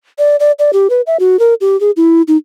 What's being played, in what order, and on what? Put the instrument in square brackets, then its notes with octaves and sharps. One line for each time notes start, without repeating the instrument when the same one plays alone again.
[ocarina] D5
D5
D5
G4
B4
E5
F#4
A#4
G4
G#4
E4
D#4